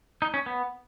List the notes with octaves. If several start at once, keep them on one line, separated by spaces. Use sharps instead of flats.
D#4
C#4
B3